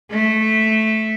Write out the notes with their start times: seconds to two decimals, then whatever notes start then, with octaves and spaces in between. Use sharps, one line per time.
0.11 A3